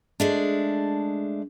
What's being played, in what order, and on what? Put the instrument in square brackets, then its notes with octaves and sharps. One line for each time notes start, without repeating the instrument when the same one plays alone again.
[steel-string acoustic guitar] G#3 A3 D4